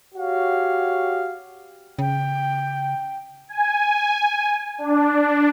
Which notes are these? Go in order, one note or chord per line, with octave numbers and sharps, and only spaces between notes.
F#4 G4 C#5 F5
C#3 G5
G#5
D4